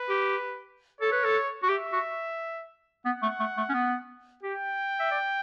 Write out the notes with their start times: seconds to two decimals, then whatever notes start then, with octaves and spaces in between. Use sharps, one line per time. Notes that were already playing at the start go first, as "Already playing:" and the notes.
Already playing: B4
0.09 G4
1.01 A4 C#5
1.12 B4
1.24 A4
1.63 F#4
1.69 G4 E5
1.93 F#4
3.05 B3 F#5
3.22 A3
3.40 A3
3.57 A3
3.69 C#4
3.74 B3
4.43 G4 G5
5.00 E5
5.11 D5